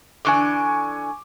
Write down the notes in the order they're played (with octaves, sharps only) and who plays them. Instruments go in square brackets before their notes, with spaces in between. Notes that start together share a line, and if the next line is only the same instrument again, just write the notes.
[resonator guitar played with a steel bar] D3 E3 D4 [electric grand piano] G#5 C#6 D6